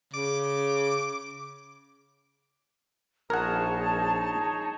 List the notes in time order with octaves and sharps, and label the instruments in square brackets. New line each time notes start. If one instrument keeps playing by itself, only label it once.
[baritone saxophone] C#3 [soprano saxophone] D6
[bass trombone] A#1 [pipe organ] D#4 G#4 C#5 [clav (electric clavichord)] A#4 F#5 [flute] A5